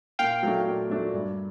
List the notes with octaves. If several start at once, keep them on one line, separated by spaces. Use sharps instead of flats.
A#2 F5 G5
F#3 A3 D4
A#2
F#3 A3 D4
G2